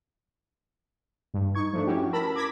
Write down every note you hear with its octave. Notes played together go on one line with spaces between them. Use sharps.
G2
D#4 C#6 G#6
F3 A3 D4
C#4 E4 F#4 G4
A#4 A5 B5 E6 A#6
D6 G#6 A#6 B6